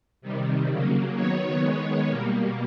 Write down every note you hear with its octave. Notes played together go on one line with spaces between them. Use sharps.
C3 D#3 G3
C#3 F#3 A#3
D#3 F#3 B3 C#5
D#3 G#3 B3 C#5
B2 G3 A#3